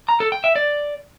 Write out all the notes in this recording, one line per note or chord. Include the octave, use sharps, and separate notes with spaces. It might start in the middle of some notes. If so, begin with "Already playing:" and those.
A#5
A4
G5
E5
D5